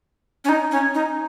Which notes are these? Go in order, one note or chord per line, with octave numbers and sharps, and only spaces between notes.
C#4
D#4
C#4
D#4